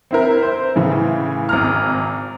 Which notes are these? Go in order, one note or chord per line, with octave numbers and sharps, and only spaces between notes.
C4 E4 A#4
C5
A2 C#3 E3
G#1 A#5 F6